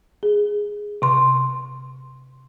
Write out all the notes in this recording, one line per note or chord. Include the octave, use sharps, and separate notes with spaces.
G#4
C3 C6